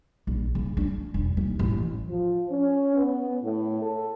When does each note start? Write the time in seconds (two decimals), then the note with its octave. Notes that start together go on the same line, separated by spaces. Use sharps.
0.27 A#1
0.55 C#3
0.77 D4
1.14 E1
1.37 D#2
1.59 A1
2.09 F3
2.51 C#4
2.96 B3
3.41 A2
3.80 A4